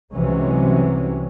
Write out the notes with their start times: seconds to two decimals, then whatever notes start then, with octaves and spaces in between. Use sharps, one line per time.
0.14 C2 C3 E3 F#3 G#3 C#4